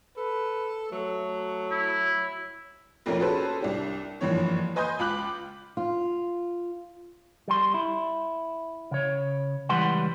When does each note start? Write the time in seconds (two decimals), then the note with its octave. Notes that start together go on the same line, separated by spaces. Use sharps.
0.17 A4 B4
0.92 F#3 A3
1.71 E4
3.06 F1 A#1 F2 A3 C#4 A#4
3.19 C#4 F#4 G#4 A4 B4 C5
3.60 C2 D4 G4
4.21 F#1 G2 E3 F3 C#5
4.76 B4 D#5 G#5 C6 D#6 G6
4.99 C#2 F4 B5 D6 F#6 F#7
5.77 F4
7.48 G3 C6
7.74 E4
8.91 C#3 C#5
9.69 C#2 E3 G3 B4 F#5 C6